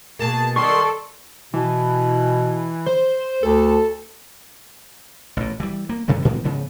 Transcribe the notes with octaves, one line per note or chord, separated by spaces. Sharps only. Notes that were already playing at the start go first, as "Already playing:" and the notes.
B2 A#3 G#4 A5
D#3 G3 A4 D5 C6 C#6
B2 E3
C5
D2 A4
A1 A#2
E3 G3
A#3
F#2 C3 E3 G#3
A2 E3 G#3 C4
G#2 C#3 F3 B3